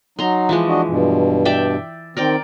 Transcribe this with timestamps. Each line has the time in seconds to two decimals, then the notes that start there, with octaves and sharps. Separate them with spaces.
0.19 F#3 D#4 A#5 C6
0.49 E3 F3 G#3
0.68 D4 F#4 D#5
0.88 G2 B2
1.45 D5 E5 G5
2.17 D#3 C4 A#4 D5 G5